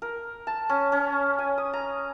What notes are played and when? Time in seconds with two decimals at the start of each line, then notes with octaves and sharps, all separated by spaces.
0.02 A#4
0.47 A5
0.69 C#4
0.92 C#4
1.39 G#5
1.58 D#6
1.73 A#5